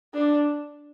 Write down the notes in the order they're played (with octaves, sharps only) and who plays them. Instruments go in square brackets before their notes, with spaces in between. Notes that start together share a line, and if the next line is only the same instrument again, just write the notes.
[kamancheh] D4